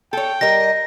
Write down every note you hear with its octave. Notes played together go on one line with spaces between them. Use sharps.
A4 C#5 G5
G3 A#4 D#5 A#6